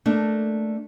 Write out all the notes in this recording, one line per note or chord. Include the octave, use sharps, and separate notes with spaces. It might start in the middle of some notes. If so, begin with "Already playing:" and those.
A3 A#3 D4